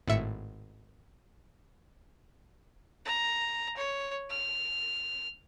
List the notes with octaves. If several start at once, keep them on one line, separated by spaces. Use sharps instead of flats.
G#1 A2 E5 C#7
A#5
C#5
F6